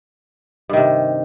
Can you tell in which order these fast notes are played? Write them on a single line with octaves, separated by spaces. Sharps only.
G2 D#3 C3